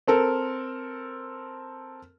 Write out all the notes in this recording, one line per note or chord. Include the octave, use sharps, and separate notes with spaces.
C4 A4 A#4